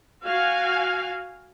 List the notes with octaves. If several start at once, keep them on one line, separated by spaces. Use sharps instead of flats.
F#4 F5 G#5